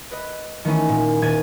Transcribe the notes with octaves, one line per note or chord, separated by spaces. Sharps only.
B4 D#5
D#3 E3 A3 C#4
A#2
D#1 G#6 A6 D#7